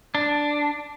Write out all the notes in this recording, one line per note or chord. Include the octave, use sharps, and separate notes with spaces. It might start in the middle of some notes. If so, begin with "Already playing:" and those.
D4